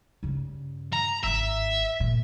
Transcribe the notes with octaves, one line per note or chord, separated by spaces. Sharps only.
G2 C#3
A#5
G#1 D4 E5
A#2